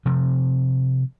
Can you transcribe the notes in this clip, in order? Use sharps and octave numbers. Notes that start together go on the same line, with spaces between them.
C3 F3 C4